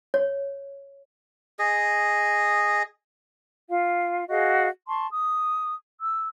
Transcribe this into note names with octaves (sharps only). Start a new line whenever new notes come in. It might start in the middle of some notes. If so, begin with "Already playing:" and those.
C#5
G#4 D#5
F4 F5
F#4 G#4 D#5 F5
A5 C6 C#6
D#6
E6